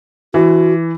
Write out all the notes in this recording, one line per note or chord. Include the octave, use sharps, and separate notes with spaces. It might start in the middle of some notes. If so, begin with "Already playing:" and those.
E3 F#4